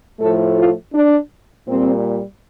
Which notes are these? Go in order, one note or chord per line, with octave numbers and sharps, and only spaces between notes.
A2 F3 A3 A4
F4
D4
A#2 G3 C4